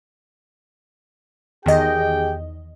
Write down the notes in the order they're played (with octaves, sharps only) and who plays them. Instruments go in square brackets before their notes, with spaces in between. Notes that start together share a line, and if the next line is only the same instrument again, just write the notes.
[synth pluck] E2 D#3 D#5 [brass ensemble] G4 G#4 G5